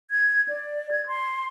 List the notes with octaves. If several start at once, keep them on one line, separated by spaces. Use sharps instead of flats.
G#6
D5
G#6
C6